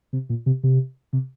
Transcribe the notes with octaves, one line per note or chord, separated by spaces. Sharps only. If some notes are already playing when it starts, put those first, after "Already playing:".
C3
A#2
C3
C3
C3